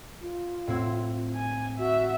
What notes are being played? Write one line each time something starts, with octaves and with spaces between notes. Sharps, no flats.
F4
A2 C4 E4
G#5
F#4 E5